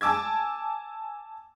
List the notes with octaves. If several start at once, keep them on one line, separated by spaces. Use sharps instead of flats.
G#5 A5 D6 E6 G#6